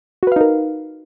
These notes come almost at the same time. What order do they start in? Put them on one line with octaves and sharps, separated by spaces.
F#4 B4 F5 D#4 A#4